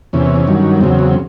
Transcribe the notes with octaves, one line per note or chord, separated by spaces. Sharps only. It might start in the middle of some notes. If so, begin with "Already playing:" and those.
E2 C3 E3 C#4
G2 D#3 F#3
E2 C#3 F#3 C4
C4